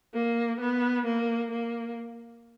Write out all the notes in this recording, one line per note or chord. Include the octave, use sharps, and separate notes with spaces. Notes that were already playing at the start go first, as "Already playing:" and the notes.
A#3
B3
A#3
A#3